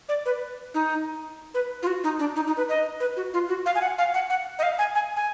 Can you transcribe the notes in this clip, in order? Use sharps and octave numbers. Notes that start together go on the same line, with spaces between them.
D5
B4
D#4
B4
F4
F#4
D#4
D4
D#4
D#4
B4
D#5
B4
F#4
F4
F#4
F5
G#5
F#5
F5
F#5
F#5
D#5
F5
G#5
G#5
G#5